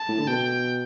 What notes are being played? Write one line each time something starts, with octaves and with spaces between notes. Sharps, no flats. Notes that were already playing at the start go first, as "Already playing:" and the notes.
Already playing: A5
A2
D3
B2 G5